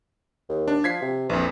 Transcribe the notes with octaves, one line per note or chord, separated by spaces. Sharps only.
D#2
D4
F3 G#6 B6 C7
C3
A#1 F2 E3